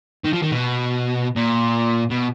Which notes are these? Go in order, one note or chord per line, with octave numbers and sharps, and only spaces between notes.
D#3
F3
D#3
B2
A#2
B2